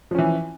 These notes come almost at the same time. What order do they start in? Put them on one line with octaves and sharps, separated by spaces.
F3 C#4 E3